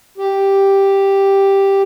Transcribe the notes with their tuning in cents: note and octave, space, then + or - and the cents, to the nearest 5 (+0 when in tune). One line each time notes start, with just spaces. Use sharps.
G4 +0